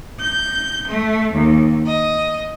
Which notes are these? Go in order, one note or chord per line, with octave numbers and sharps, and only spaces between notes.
G6
A3
D#2
D#5